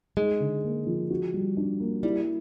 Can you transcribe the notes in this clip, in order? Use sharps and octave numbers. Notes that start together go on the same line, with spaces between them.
G#3 D#4
D3
A#3
F3
F#4
G3
D4
A#3
G3 E4